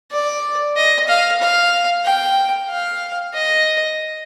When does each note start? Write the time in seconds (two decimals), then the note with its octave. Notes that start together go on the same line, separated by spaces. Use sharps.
0.12 D5
0.76 D#5
1.08 F5
1.41 F5
2.05 G5
2.69 F5
3.34 D#5